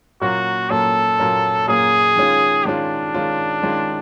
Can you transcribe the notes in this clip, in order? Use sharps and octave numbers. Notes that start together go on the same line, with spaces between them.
A#2 F#3 A#3 C#4 F#4
A#2 F#3 A#3 C#4 A4
A#2 F#3 A#3 C#4
A#2 F#3 A#3 C#4 G#4
D#3 G#3 C#4 F4
D#3 G#3 C#4 D4 F4
D#3 G#3 C#4 F4
D#3 G#3 C#4 F4